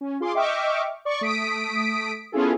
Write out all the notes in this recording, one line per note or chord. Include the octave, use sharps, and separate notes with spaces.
C#4
F4 G#4 C6 D6
D#5 E5 G5 C#6 D6 F6
D5 C#6
A3 D#6 B6 D7
B3 C#4 E4 F4 G#4 A4